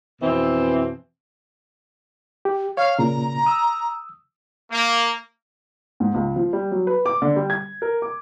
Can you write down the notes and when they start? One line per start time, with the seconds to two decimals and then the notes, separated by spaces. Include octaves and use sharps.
0.22 F2 B2 E3 C4
2.45 G4
2.77 C#5 F5
2.99 A#2 C#3 A#5
3.46 D#6 E6
4.70 A#3
6.00 G#2
6.14 C#2
6.36 F3
6.53 G3
6.72 F#3
6.87 B4
7.06 D6
7.22 D3
7.36 G3
7.50 G#6
7.82 A#4
8.02 D6